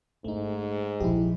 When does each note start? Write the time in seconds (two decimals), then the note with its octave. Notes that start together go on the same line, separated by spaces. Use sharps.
0.25 G#1 G#2 A3 D#4
1.00 A#1 F3 E4 G4